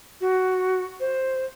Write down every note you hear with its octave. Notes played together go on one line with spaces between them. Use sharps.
F#4
C5